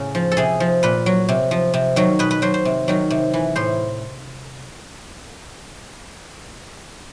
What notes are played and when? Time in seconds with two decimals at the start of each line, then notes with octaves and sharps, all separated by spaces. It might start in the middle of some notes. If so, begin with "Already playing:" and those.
Already playing: A2 C#3
0.15 F3
0.32 A4
0.37 C3 G#4
0.60 F3
0.83 A#2 B4
1.06 F#3
1.29 C3
1.51 F3
1.74 C3
1.96 D#3 F#3
2.19 B2 B4
2.31 B4
2.42 F#3 C5
2.54 C5
2.65 C3
2.88 D#3 F#3
3.10 C3
3.34 E3
3.56 A2 C5